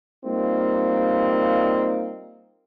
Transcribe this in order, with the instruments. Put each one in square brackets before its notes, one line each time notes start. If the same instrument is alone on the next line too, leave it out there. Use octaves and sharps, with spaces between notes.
[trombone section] G3 A#3 C4 D#4 F4